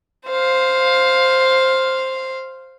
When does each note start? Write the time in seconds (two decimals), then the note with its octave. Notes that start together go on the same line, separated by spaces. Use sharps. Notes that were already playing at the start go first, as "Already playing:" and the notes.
0.28 C5 F5